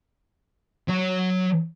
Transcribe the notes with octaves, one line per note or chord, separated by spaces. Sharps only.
F#3 C#5